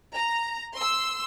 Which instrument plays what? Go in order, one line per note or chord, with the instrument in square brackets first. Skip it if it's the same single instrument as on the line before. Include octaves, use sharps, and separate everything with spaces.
[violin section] A#5
C6 E6